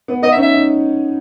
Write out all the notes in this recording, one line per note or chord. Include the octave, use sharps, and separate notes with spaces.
B3
B3 D#5
D#4 E5
C#4
E5
D#4